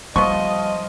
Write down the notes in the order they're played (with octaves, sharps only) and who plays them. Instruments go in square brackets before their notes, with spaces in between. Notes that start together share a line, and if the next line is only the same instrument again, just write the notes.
[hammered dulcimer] F3 [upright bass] G3 [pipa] B3 C#6 [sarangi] D#5